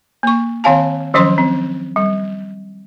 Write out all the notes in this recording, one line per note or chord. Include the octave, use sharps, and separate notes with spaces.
A#3 C#6
D#3 C4 C#5 F5 G#5 A5
D#3 F3 F#3 C#4 C5 C6
C4
G3